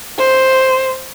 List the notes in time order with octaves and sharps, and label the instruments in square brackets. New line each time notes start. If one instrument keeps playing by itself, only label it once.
[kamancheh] C5